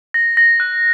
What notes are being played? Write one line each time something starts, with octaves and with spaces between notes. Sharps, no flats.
A#6
A#6
F#6